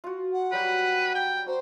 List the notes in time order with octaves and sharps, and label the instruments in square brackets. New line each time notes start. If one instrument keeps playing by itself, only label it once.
[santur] F4 F#4
[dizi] F#5
[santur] F#3 G3 G5 [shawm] B4
[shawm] G5
[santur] F#4 A#5 [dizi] C5